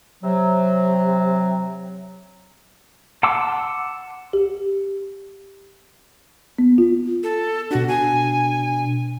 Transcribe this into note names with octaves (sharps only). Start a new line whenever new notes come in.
C3 F#3
F#5 A5 C6 D6 E6
G4
B3
F4
A4
B2 D4 F#4
G#5